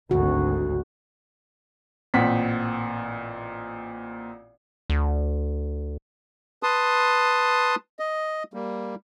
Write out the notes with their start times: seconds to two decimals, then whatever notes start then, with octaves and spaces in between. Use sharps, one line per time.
0.11 G#1 D2 F#4
2.14 A1 A#2 C4 F#5 B6
4.90 D2
6.63 B4 A5 C6 D#6
7.99 D#5
8.54 G3 A#3